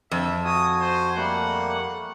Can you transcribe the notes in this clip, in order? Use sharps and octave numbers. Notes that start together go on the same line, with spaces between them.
F2 E5
F#4 G#5 D#6
C5
G3 A3 A#3 F#5